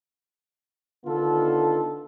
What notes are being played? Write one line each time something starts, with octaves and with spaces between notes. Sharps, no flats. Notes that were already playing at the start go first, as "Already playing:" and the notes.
D3 D#3 B3 F4 A4